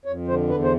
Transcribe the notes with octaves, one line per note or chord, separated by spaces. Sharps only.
F2 C#5
D3 C5
E2 B4
C5